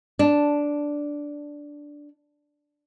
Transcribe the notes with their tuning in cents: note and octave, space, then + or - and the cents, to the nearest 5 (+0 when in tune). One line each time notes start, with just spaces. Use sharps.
D4 -5